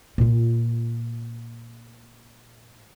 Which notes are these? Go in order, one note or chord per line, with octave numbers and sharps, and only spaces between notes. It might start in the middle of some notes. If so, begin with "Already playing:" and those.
A#2 F4